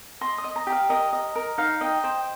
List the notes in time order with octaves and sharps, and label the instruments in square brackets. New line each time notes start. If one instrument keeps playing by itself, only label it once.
[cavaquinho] D#5 C6
D#6
D#5
A#5
G4
F5
A#4 D#5
D#5
A#4
D#4 F5
D#5 G5
C5 G5